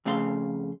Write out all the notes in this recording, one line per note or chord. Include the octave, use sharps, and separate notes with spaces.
F2 C#3 A3 G#4 F5 C6